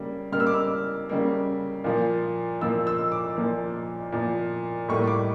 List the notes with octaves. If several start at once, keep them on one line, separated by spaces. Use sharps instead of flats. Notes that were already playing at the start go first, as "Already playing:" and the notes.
Already playing: C#3 G3 A#3
C#3 G3 A#3 F6
E6
D6
E6
C#3 G3 A#3
A#2 F3 A#3
A#2 F3 A#3 E6
E6
D6
A#2 F3 A#3
A#2 F3 A#3
A2 G3 A#3 C#6
D6